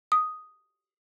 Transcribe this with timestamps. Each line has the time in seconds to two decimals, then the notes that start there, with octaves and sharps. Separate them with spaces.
0.12 D#6